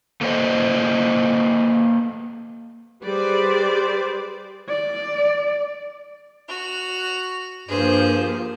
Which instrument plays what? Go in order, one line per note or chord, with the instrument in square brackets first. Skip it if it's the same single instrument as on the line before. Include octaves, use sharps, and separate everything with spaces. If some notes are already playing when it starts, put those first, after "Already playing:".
[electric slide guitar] A3 A#3 A4 B4 C5 D#5
[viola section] G3 G#4 B4 C5 D5
[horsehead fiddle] D5
[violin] F#4 F7
[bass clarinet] G2 [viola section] F3 A#3 G4 [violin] G#4 C5